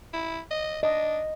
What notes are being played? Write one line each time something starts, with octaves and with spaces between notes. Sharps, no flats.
E4
D#5
D4 D#5